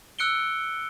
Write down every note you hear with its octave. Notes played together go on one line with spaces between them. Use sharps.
E6 F#6 C#7 D7 G7